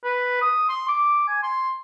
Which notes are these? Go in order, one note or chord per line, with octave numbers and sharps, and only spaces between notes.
B4
D#6
C6
D6
G#5
C6